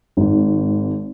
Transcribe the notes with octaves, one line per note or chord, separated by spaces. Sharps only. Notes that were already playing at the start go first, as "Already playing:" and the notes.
G#1